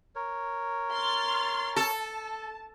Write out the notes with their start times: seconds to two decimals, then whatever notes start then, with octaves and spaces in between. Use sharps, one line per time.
0.15 A#4 C#5
0.92 C6 F6 A6
1.76 A4 A5